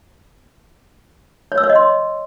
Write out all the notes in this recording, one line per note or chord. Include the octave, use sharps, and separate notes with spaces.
C#5
E6
C#5
D#5
C6